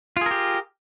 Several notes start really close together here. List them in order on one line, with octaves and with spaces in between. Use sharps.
F4 G#4 A#4 G4